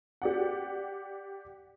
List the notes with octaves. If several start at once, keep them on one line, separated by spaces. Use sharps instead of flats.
G4 D5 F#5